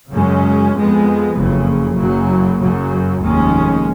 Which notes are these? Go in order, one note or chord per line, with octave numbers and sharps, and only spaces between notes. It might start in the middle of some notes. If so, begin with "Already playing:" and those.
F#2 C#3 G#3 C#4
F2 F3 G#3 B3
F#1 F2 C#3
F#1 F#2 C#3 F#3
F#2 C#3 F#3
F1 D#2 D#3 G#3 C#4